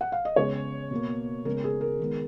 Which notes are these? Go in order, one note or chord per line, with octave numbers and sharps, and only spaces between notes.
F#5
F5
D#5
C#3 G#3 B3 C#5
B2 A#3
C#3 G#3 B3 A#4
G#4
A#4
D#3 G#3 B3